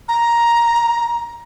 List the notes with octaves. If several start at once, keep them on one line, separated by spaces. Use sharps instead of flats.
A#5